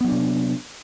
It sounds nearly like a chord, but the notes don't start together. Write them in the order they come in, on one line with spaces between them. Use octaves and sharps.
B3 F#3 D4 C3